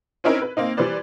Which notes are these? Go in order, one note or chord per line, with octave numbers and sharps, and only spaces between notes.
C4 C#4 D#4 E4 A#4 C5
B4
A#3 C4 D#4
E3 G3 B4 C5 D5